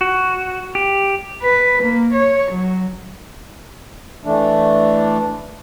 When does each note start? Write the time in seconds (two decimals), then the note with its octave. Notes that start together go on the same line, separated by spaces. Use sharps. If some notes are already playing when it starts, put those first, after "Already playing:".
0.01 F#4
0.75 G4
1.42 B4
1.83 A#3
2.13 C#5
2.51 F#3
4.25 E3 A3 D4